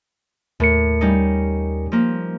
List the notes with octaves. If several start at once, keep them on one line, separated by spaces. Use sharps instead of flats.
D#2 A2 A#4 C#7
G3 C#4 D#4
F3 A#3